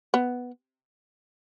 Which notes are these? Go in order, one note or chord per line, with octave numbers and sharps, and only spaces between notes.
B3